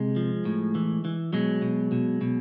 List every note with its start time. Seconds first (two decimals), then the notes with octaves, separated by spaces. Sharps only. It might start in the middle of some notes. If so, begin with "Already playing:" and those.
Already playing: C3 G#3
0.16 F3
0.45 A2
0.75 E3
1.05 E3
1.33 B2 F#3 G#3
1.62 B2
1.92 B2
2.21 B2